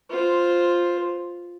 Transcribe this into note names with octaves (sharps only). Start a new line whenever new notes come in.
F4 C5